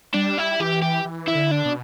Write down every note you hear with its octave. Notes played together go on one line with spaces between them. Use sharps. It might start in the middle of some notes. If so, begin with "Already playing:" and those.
G3 D4
E4
E3 G4
G4
E3
E4
D3
D4
B2